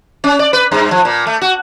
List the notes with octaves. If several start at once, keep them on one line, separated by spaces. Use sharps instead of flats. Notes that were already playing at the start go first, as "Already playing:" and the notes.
C#4
D5
B4
G2
F3
A#2
A3
F#4